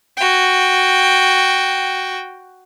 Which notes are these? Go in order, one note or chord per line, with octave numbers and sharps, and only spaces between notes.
F#4 G5